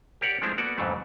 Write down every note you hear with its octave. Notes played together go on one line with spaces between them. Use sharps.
G4 A#4 C#5 D5 F#5
F3 G#3 A3 C4 D4 E4
A#3 B3 F#4 A4 D5
F2 G#2 C#3 E3 F#3 A3